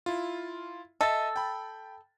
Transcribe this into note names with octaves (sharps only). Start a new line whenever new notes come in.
E4 F4
A4 D#5 E5 A6
G5 B5